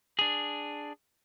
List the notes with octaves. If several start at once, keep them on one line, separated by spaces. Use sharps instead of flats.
D4 G#4